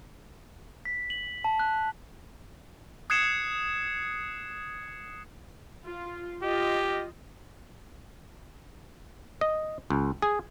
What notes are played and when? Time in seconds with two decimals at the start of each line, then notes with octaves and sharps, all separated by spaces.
0.85 B6
1.10 F#7
1.44 A5
1.59 F#6
3.10 D#6 F#6 G#6 C7 C#7 E7
5.84 F4
6.42 F4 G4 D#5
9.41 D#5
9.90 C#2
10.22 G#4